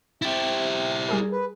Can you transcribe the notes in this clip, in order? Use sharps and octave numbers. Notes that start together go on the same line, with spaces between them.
C3 E4 G4 A6
G3 G#4 A#4
B4